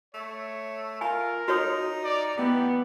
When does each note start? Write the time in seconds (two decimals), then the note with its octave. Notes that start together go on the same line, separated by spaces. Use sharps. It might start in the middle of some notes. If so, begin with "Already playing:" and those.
0.14 A3 C#5
1.01 F4 A#4 G#5
1.48 D#4 F#4 C#5 D#6
2.04 D5
2.37 E3 B3 G4